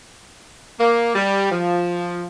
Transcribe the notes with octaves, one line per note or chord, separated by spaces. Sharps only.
A#3
G3
F3